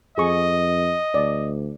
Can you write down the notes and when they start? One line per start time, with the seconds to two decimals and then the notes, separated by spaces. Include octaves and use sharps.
0.18 F2 G#4 D#5 C#6
1.14 D2 D5